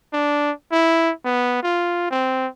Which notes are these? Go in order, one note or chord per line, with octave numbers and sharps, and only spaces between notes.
D4
E4
B3
F4
C4